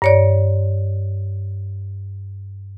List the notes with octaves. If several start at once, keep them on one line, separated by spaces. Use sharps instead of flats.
G2 C#5 D5